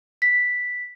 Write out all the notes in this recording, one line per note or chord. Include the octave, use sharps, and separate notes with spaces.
B6